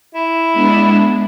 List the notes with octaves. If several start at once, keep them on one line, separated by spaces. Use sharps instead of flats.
E4
G#3 B3 D4